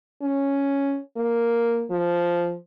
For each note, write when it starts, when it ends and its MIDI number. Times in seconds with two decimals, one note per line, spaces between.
0.22 0.98 61
1.17 1.85 58
1.91 2.55 53